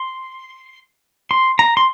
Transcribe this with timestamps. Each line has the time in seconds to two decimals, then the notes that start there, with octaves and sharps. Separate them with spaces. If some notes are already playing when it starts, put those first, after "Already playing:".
Already playing: C6
1.31 C6
1.59 A#5
1.77 C6